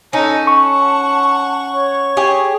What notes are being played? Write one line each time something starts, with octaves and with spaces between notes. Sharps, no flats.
C#4 D#4 A4 A5
F#5 C#6
C#5
G4 G#4